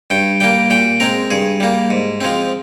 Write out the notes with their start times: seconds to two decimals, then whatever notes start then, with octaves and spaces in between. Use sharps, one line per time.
0.10 G2 G5
0.40 G3 A#3 G5
0.70 A#2 G5
1.00 G#3 C4 A#4
1.30 G2 G#4
1.60 G3 A#3
1.90 G#2
2.21 F3 G#3 C4